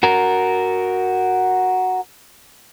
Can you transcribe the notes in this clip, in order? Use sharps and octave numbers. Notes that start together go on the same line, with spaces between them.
F#4 A#4